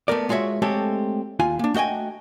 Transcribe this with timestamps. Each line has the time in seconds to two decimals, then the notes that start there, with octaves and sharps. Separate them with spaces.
0.08 A3 B3 A#4 D5
0.29 G#3 F4 F#4 C#5 E5
0.62 G#3 A3 C4 G4 A4 C#5
1.39 D#2 F4 G#5
1.59 A#3 D4
1.74 A3 F#4 D#5 G5 G#5